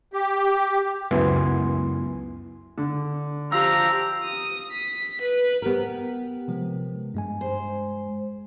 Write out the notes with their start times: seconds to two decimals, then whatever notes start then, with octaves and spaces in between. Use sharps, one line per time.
0.13 G4
1.11 C#2 F#2 B3 E4 G#5 C6
2.78 D3
3.52 F3 G4 F5 A#5 E6
4.24 D#6
4.72 B6
5.22 B4
5.62 B3 G4 A#4
6.48 C3 F3 G#3
7.14 G2 G#3 G#5
7.41 C5